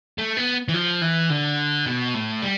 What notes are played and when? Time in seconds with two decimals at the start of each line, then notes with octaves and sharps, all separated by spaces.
0.18 A3
0.37 B3
0.68 E3
0.74 F3
1.02 E3
1.30 D3
1.86 B2
2.14 A2
2.42 G3